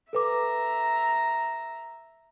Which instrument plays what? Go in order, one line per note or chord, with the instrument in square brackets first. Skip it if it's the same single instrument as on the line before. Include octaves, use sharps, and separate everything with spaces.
[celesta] A4 B4 D6 [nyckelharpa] E5 A#5